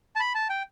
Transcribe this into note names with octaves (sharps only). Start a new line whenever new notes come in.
A5
B5
A5
G5